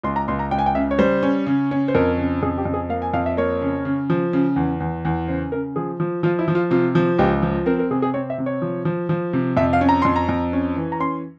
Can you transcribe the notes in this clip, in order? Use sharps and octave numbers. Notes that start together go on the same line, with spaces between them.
C#2 C6
A#5
C#2 C6
A#5
C#2 G5
G#5
G5
C#3 E5
C#5
G3 C5
C#4
C#3
C#4
C5
F2 A#4
C#3
F2 G#4
G4
F2
G#4
A#3 F5
G#5
F2 F5
E5
A#3 C#5
C#3
C#3
F3
C#3
E2
E2
E2
C#3 C5
C#3 A#4
F3 G#4
F3
F3 F4
E4
F3
F4
C3 F4
F3
C#2 G4
F3
C4 A#4
A#4
C3 G#4
G#4
C4 C#5
E5
C3
C#5
F3
F3
F3
C3
F2 E5
F5
C#4
A#5
F2 C6
A#5
F2
C#4
E3
A#5
C#4 C6